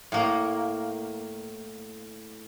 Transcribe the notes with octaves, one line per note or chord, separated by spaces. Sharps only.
A2 A#3